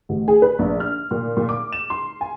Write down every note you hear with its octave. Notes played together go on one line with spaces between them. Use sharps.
A1
G#4
B4
A#1
F6
A#2
A#2
D6
E7
C6
G#5